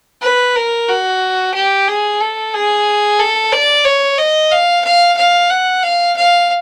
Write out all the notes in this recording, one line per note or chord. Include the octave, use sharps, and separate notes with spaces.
B4
A#4
F#4
G4
G#4
A4
G#4
A4
D5
C#5
D#5
F5
F5
F5
F#5
F5
F5